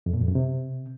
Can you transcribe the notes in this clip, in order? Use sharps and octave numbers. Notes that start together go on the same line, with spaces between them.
F2
A#2
F2
F#2
C3